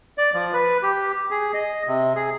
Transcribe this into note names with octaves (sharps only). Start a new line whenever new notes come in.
D5
F3
B4
G4
G#4
D#5
C3
G#4